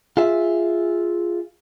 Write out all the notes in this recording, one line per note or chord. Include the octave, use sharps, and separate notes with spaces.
F4 G#4 E5